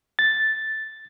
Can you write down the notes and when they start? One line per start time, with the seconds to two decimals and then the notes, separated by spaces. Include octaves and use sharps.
0.19 A6